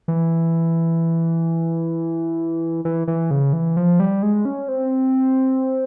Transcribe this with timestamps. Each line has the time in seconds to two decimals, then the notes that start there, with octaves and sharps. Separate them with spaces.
0.08 E3
2.85 E3
3.08 E3
3.31 C#3
3.53 E3
3.77 F3
4.00 G3
4.22 G#3
4.45 C#4
4.68 C4